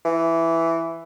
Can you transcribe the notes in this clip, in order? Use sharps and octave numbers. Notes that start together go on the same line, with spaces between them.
E3